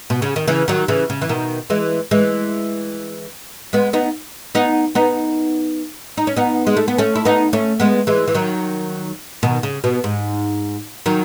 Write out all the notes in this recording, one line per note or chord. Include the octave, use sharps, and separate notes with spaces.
B2
C#3
D#3
C#3 E3
D#3 F#3
C#3 E3
C#3
E3
B2 D#3
E3 G#3
E3 G#3
G#3 B3
B3 D#4
B3 D#4
B3 D#4
D#4
C#4
B3 D#4
G#3
A3
B3
A3 C#4
E4
B3 D#4
A3 C#4
G#3 B3
E3 G#3
E3
D#3 F#3
B2 D#3
C#3
B2
G#2
D#3 F#3